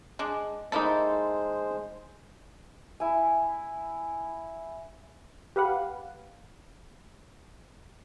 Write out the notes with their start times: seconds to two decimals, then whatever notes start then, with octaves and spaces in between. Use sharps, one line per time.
0.19 G#3 D4
0.72 G#3 A#3 D#4 E4 A4 C5 A5
3.00 E4 G#5
5.56 G4 B4 F5 F#5